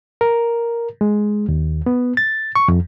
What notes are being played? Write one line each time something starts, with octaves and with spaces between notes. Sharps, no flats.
A#4
G#3
D#2
B3
A6
C#6
F2